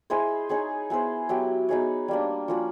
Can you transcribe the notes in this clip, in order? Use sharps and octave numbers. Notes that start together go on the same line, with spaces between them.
E4 G#4 C5 D#5
D#4 G#4 C#5
B3 E4 G#4 C5
F#3 B3 E4 G4
B3 D#4 G#4 C#5
G3 A#3 D4
F3 A#3 C#4 F#4